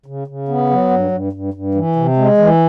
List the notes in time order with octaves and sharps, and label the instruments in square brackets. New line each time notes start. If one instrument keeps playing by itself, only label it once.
[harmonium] C#3
C#3
B3
F#3
G2
G2
G2
G2
E3
C3
G#3
E3